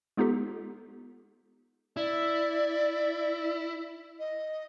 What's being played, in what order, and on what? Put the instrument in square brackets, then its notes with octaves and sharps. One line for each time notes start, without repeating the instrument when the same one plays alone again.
[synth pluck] G#3 B3 D#4 F4 G4 A4
[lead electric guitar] E4 [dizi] D5
[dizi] D#5